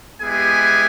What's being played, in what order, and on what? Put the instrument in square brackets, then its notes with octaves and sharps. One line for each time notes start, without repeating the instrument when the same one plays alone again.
[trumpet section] G#3 B3 E4 G4 G#4 G#5